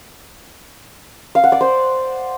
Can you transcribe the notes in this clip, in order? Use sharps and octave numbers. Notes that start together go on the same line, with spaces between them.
F5
F#5
D5
C5